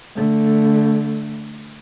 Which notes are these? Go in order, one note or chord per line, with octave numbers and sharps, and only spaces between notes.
D3 A3